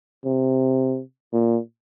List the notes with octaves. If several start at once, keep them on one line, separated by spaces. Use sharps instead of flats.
C3
A#2